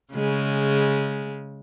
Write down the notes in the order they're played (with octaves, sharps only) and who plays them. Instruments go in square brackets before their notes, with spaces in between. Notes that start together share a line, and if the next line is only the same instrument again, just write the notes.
[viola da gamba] C#3 G#3